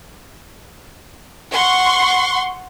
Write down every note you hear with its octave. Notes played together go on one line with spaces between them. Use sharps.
F#5 C6 C#6